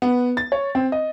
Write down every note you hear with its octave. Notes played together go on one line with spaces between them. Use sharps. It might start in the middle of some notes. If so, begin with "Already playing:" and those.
B3
A6
C#5
C4
D#5